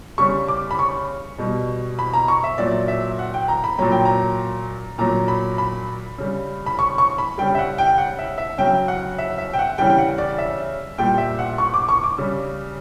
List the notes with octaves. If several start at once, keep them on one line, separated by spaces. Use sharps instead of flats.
C#3 G3 C#6
D6
B5
C#6
B2 G3
B5
A#5
C#6
E5
A#2 F#3 D5
E5
F#5
G5
A#5
B5
A#2 F#3 A#5
G5
A#5
A#2 F#3 A#5
B5
B5
C#3 G3
B5
C#6
C#6
B5
C#3 G3 G5
E5
F#5
G5
F#5
E5
E5
C#3 F#3 G5
F#5
E5
E5
G5
F#5
C#3 E3 G3 G5
G5
F#5
D5
E5
A#2 G3 G5
E5
F#5
C#6
D6
C#6
D6
C#3 G3